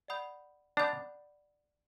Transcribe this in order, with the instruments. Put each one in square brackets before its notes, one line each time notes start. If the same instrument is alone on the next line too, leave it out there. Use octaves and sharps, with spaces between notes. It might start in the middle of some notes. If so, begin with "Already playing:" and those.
[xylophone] D5 F#5 B5 D#6 G6
[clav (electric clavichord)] D4 [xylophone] D5 F#5 B5 D#6 G6